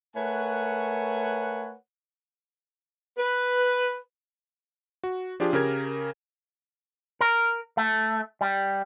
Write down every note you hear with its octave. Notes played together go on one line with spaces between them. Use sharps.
A3 A#4 B4 C#5 F#5 G#5
B4
F#4
F3 D4 F4 G4 G#4
C#3 G4 A#4 G#6
A#4
A3
G3